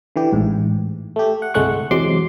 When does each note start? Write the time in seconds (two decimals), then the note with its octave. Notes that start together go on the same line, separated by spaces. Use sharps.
0.16 D3 E3 G4
0.32 A1 G#2
1.16 A3 G4
1.42 F#5
1.54 G1 C2 G#3 A3 F#5 C#6
1.91 E2 C3 F#3 G#3 C6 D6